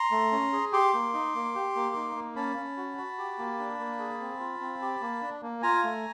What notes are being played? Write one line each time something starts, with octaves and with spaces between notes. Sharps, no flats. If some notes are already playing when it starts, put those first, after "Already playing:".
Already playing: A#5 C6
A3
C#4
G#4
G4 C6 D6
A#3
D#4
A#3
G4
A#3
D#4
A#3
C#4 A5 B5
C#4
F#4
F#4
G4
A#3
D4
A#3
G#4
C4
F4
C4
G4
A#3
D4
A#3
F4 G#5 A#5
A3